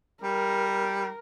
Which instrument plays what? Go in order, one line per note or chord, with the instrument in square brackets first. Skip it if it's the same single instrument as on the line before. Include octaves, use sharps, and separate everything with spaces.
[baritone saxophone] G3 [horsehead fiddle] A#4